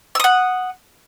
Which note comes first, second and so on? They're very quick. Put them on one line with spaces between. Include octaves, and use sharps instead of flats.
E6 D#6 F#5